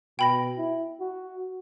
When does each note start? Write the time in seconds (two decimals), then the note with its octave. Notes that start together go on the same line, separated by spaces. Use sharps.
0.19 B2 G5 B5 A#6
0.58 E4
1.01 F#4